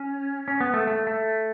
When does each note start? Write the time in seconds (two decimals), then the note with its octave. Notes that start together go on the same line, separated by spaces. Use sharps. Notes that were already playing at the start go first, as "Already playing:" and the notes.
Already playing: C#4
0.48 C#4
0.61 B3
0.74 A3
0.87 A3
1.07 A3